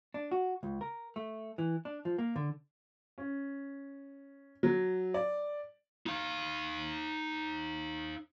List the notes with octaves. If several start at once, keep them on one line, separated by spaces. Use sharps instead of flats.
D4
F#4
C#2
A#4
A3
E3
D4
F3
A#3
D3
C#4
F#3
D5
D#4 F5